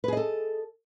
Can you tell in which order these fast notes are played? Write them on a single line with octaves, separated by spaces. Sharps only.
B4 G#4 D#5 A4